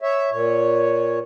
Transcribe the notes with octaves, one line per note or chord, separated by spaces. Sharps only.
C#5 E5
A#2 C#5